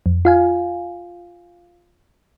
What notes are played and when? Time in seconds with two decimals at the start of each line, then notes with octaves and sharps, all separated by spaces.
0.06 F2
0.25 F4 F5 G#5